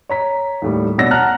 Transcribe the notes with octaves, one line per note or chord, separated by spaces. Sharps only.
C#5 A#5 B6
D#2 A2 G3
B2 D4 C#5 F#5 E6 A#6
F#5 A5 A#5 F6 F#6